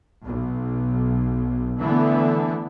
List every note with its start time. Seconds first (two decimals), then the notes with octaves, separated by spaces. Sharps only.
0.22 B1
1.78 D3 E3 A3 B3